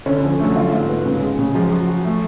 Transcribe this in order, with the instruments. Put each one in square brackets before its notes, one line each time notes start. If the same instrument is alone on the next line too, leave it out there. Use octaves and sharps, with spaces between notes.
[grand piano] D3 [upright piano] C#4
[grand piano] D3
[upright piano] F3
[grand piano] D3 F#3 [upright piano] A3
[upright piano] F4
G#2
B3
C#3
G#3
C#3
[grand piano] F3 G#3 [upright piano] F#3
[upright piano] F#4
F#4
A3